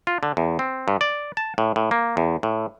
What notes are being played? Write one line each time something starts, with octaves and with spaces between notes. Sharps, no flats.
F4
D3
E2
C4
G2
D5
A5
A2
A2
A#3
E2
A2